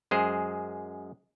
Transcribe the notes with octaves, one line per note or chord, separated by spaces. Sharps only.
F#2 G#3 G#4 C5